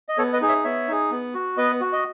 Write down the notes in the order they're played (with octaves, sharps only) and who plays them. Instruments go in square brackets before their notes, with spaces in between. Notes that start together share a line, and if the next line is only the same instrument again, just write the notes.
[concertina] D#5
B3 A4 C#5
B4 D#5
D#4 G#4
C#5 E5
B3 C#5 E5
D#4 G#4
B3
F#4
B3 B4 D#5
F#4
D#5